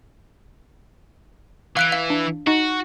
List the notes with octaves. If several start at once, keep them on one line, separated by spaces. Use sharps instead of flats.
E3 F5 F#6 D7
F5
D4
D#4 F#4